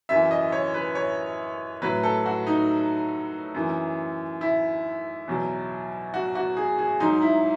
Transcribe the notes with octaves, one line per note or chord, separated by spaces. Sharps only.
F#2 E3 E5
D#5
C#5
B4
C#5
A2 F#3 B4
A4
F#4
D#4
F#2 E3
E4
E2 B2 F#3
F#4
F#4
G#4
G#4
G#2 F#3 D#4
E4